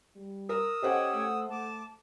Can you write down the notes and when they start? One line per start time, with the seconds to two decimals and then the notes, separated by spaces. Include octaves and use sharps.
0.16 G3
0.49 A#4 D#6 E6
0.83 C#4 G4 A4 C5 D#5 F#5
1.14 A3
1.49 A3 A5 D6